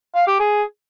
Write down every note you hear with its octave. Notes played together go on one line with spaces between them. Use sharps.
F5
G4
G#4